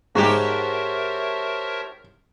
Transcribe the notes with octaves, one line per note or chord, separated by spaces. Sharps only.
G#2 F#4 G4 A#4 C5 C#5 E5 A5